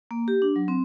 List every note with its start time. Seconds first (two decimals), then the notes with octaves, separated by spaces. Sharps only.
0.11 A#3
0.28 G4
0.42 D4
0.56 F#3
0.68 C4